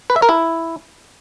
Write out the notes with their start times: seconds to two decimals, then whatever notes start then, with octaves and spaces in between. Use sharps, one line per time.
0.10 B4
0.16 E5
0.22 A#4
0.29 E4